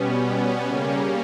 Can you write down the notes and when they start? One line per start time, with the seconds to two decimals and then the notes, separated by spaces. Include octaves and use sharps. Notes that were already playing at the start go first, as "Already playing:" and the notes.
Already playing: B2 G3 B3 C#4
0.23 B3
0.66 C#3 G3 A#3 C#4